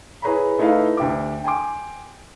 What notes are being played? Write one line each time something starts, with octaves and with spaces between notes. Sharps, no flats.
E4 G#4 B4 C#5 A#5 B5
A3 D#4 E4 A4 B4 F5
D2 G4 E5 D6
G5 G#5 C6 D6